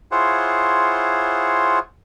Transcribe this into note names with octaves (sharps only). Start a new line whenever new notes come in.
E4 F4 G#4 C5 C#5 F#5